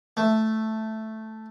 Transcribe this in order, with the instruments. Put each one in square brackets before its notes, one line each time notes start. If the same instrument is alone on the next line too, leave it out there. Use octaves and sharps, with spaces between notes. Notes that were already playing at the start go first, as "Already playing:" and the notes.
[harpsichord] A3